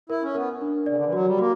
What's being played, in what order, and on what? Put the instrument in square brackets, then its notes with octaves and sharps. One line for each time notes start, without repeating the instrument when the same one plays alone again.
[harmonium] E4 [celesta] A#4
[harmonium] C#4
[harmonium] B3 [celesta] A#4
[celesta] D4
[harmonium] C#3 [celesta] D5
[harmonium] D3
E3
[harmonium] F#3 [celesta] F#4
[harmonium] G3
[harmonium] A#3 [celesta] F#4